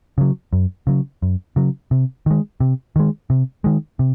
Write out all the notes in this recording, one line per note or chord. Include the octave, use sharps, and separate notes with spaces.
C#3 F#3
F#2
C#3 F#3
F#2
C#3 F#3
C3
D#3 G#3
C3
D#3 G#3
C3
D#3 G#3
C3